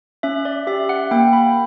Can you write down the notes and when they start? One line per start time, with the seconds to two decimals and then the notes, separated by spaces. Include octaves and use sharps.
0.23 C#4 E5
0.45 D5
0.67 G4 E5
0.89 F#5
1.11 A#3 G5
1.33 B5